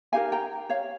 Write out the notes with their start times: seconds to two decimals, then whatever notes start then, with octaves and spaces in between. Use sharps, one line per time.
0.13 D#4 G4 A#4 F5 G#5
0.32 G5 A#5
0.69 C#5 F5